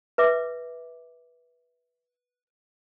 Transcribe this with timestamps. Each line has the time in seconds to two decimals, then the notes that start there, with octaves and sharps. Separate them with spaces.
0.18 B4 E5 D6